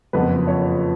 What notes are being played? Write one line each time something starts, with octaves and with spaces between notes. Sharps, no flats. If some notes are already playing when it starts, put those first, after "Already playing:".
F#1 F2 F3 B3 B4
C#5